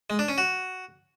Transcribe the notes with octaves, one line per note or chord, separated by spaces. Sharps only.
G#3
D4
C#4
F#4